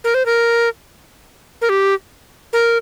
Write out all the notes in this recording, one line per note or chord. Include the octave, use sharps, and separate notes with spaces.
A#4
C5
A#4
A#4
G4
A#4